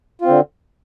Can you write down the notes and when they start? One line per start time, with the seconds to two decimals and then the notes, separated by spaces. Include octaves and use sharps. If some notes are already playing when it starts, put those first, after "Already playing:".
0.22 F4
0.25 C4
0.29 D3